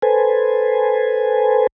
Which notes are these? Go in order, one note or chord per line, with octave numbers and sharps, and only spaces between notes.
A4 B4 C5 G#5